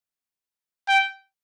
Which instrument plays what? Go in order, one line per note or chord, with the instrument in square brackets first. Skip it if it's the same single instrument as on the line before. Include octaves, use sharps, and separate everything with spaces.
[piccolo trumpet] G5